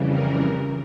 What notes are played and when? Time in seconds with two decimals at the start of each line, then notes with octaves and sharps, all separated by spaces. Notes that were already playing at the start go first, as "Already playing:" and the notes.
Already playing: F2 C#3 E3 G3
0.10 A#4